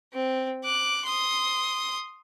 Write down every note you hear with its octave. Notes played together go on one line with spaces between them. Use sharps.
C4
D6 F#6
C6 D#6